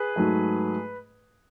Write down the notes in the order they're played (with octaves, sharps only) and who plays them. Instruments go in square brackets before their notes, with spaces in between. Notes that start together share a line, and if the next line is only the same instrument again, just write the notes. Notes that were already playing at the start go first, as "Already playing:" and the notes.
Already playing: [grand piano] G#4 B4
G#2 F#3 A3